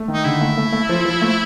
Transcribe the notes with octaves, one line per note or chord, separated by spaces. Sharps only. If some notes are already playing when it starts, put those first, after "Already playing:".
Already playing: A3
D#3
D#4
D3 E4
A3
A3
A3
F3
F3
A3